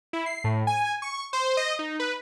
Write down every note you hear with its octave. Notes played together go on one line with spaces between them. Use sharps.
E4
C7
A2
G#5
C#6
C5
D#5
D#4
B4